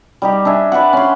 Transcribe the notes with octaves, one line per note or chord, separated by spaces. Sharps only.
G3 D#4 G4
D4 D#5 E5 G#5
B4 D5 E5 F#5
C#4 C6